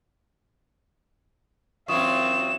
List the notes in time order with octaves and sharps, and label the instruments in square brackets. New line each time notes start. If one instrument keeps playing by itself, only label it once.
[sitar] F#2 E3 E4 [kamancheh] C4 F4 [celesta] C#6 D#6 [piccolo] E7